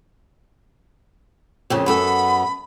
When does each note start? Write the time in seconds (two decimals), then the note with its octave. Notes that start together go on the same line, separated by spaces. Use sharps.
1.70 F2 A#2 C#3
1.86 F#2 B3 A4 B5